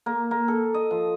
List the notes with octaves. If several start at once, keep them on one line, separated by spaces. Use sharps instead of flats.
A#3
A#3
A4
D#5
F3